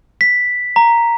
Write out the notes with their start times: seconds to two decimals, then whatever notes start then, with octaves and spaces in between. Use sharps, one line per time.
0.21 B6
0.76 A#5